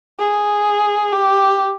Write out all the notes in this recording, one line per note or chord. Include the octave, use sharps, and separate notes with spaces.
G#4
G4